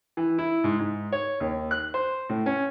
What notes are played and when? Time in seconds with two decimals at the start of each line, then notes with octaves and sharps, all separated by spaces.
0.17 E3
0.38 E4
0.64 G#2
0.79 G#2
1.12 C#5
1.40 D#2
1.71 F#6
1.94 C5
2.29 A2
2.46 C#4